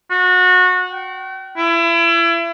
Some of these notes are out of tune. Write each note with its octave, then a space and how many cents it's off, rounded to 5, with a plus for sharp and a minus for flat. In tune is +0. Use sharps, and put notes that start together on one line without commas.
F#4 -25
G5 -45
E4 +35